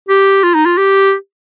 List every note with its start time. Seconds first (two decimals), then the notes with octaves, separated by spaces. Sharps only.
0.09 G4
0.43 F4
0.55 D#4
0.66 F4
0.78 G4